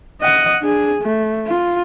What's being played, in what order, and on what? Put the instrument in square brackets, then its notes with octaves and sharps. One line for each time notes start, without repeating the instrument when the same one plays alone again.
[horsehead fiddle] D#5 F#5
D4 G#4
A3
F4